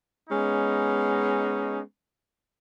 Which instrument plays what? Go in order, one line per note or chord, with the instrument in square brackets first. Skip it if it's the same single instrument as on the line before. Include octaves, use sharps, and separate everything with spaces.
[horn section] G#3 B3 C#4 D#4